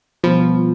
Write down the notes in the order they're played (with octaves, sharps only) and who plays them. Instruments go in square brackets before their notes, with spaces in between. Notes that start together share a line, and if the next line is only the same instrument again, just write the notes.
[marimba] B2 G3 B3 F4 [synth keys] F3